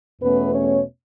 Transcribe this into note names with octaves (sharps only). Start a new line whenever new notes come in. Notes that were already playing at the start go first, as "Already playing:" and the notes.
E2 B2 A3 B3 C#4 B4
C#4 C#5